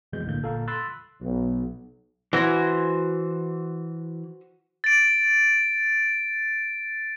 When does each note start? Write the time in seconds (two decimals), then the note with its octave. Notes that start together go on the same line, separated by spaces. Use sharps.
0.13 C2 F2 B2 E3 G#3 G6
0.26 A#1 A2 D3 A#3 G6
0.42 G1 A#2 A4 F5 A#5
0.67 B5 C6 E6 F#6 A6
1.20 B1
2.33 E3 F#4 C5 G#5
4.84 A6 D7